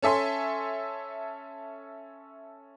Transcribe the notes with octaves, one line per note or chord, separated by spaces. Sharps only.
C#4 A4 E5 G#5 C6